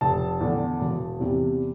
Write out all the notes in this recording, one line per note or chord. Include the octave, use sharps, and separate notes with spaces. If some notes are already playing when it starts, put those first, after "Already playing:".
F1 A5
E2 D3
E1
E2 C3